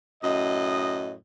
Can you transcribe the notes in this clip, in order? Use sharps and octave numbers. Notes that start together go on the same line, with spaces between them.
F#2 A2 D#5